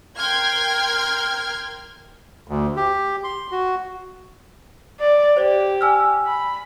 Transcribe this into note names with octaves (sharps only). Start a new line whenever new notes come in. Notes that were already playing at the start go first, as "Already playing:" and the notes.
A#4 G5 C6 F6 G#6
D2
G4
C6
F#4
D5
G4 C5 D5
G#5 E6 F6
B5